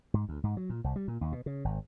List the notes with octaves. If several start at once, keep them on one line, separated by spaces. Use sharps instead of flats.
G#2
D2
G#2
F#3
A#2
C2
G3
A#2
D#2
B2
C#3
G#1